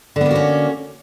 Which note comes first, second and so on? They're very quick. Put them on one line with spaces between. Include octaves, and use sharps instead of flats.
D3 B3 A#3 F#4 C#4